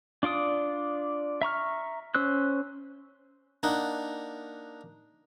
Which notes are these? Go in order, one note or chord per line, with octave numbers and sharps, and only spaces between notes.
D4 F4 D5 D#6
E5 A#5 C#6 F6
C#4 C5 E6 F#6
A#3 D4 D#4 F#5